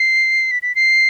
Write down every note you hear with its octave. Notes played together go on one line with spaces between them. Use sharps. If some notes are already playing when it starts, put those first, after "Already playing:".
Already playing: C7
B6
B6
C7